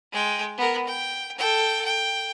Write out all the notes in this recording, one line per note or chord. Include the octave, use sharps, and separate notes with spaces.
G#3 G5
B3 A#4
G5
A4 G5
G5